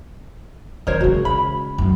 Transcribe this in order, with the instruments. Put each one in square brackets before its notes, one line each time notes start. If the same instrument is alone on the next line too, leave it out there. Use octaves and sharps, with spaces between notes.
[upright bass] D2 D#3 [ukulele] A#4 C5 C#5
[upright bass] C#3 G#3 [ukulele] F#4
[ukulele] B5
[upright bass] C#2 F#2